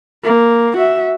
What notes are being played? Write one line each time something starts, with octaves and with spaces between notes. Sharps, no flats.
A#3
F#4 E5